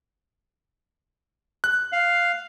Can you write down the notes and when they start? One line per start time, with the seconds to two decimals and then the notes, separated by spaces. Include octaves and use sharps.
1.64 F#6
1.92 F5